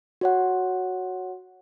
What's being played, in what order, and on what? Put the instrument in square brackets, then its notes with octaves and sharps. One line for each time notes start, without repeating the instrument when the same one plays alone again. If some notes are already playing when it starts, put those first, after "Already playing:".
[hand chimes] F#4 C#5 F#5